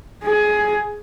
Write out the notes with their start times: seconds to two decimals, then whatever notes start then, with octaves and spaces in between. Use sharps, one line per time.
0.24 G#4